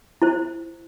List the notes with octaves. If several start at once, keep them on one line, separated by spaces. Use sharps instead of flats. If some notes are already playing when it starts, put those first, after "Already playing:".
E4 C5